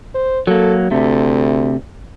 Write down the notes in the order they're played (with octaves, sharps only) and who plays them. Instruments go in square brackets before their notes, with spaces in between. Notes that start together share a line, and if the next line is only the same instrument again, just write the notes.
[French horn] C5
[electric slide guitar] F#3 A#3 [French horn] A4
[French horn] D2 [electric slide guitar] C3 A3